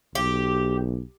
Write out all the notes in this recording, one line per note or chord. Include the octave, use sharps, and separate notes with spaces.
B1 G4